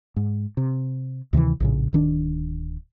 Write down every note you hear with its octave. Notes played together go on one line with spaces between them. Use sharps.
G#2
C3
D2 C3 D#3 E3
A#1 A2 C#3
D1 D#3 D4